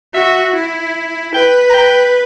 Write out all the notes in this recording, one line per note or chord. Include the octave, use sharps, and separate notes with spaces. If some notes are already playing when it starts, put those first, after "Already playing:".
F#4 E5
E4
B4 G5
A#5
G5